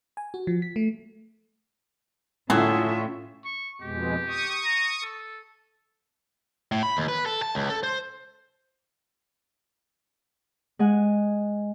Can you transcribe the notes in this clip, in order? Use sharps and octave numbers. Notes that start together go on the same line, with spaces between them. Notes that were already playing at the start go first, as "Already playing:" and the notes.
G#5
F#4
F3
B6
A3
A2 D3 F#3 C#4 F4 G#4 A4 E5
C#6
F2 B2 G#3 G4
C#6 D#6
A#5
A4
A2
B5
D#2
B4
A4
A5
C#2
A4
C5
G#3 F#5 G#5